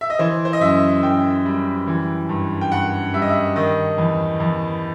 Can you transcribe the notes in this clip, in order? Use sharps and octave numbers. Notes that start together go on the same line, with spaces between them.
E5
D#5
E3 C5
C5
D#5
F#2 E5
F#2 G5
G3
E3
G2
G5
G2 F#5
G3 E5
D#5
E5
D#3 D#5
E2
E2